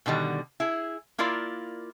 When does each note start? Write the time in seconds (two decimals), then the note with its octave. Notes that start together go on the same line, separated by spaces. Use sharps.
0.06 B2 D3 D#3 G3
0.60 E4 G#4
1.18 A#3 E4 F4 A#4 D5